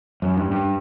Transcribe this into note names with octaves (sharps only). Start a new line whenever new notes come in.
F#2
G2
G2